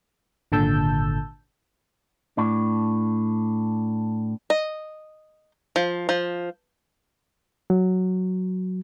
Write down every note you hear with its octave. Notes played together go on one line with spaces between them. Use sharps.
G#1 A#2 D3 A5 E6 G6
A2 D4
D#5
F3
F3
F#3